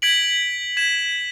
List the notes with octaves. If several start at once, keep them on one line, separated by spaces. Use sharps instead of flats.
G#6 B6 D7 F#7
G#6 B6 E7